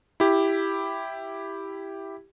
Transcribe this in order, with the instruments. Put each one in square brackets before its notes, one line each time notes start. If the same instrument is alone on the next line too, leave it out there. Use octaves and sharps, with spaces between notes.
[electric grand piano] E4 G4